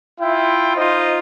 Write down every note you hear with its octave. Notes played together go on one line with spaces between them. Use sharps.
E4 F4 E5 G5
D#4 F4 C5 D#5